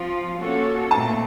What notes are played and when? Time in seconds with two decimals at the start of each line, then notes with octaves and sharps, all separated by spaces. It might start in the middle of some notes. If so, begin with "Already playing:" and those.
Already playing: F3 C4 F4
0.40 A#3 C#4 F#4 A4 C#5
0.91 A#2 A3 C4 A5